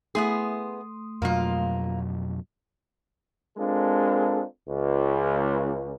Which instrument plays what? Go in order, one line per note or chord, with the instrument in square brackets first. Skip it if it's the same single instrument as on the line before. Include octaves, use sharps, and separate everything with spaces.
[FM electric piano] A3 C6 D#6 [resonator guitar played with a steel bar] B3 E4 G#4
[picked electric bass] F2 B2 F#3 [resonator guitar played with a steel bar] A#3 F4
[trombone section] G#3 C4 D4 F4 A4 A#4
C#2